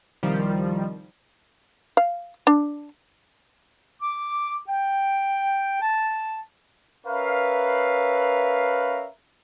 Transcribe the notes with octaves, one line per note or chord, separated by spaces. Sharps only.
C2 D#3 F3 G3
F5
D4
D6
G5
A5
C#4 A#4 B4 C#5 E5 F5